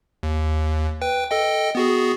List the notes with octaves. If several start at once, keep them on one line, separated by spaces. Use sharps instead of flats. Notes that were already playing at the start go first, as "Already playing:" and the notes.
D#2
B4 G5
A4 D#5 G5
B3 F#4 G#4